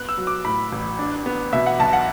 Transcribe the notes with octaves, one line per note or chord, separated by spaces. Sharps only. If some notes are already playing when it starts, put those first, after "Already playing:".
Already playing: B3 F#6
E6
F#3
D6
A2 B5
A1
D4
B3
B2 E5
F#5
B1 A5
F#5